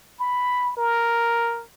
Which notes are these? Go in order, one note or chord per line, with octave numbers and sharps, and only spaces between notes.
B5
A#4